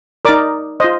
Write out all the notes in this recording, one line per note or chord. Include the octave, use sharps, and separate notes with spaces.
D#4 A#4 D5 D6
F4 C5 D#5